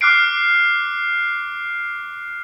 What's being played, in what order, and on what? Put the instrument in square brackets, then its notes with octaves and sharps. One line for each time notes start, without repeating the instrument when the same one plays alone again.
[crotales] D6 F6 F#6 C7 D7